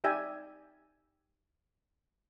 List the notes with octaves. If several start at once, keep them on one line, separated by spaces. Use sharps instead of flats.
D#4 G4 D5 E5 G5 G#5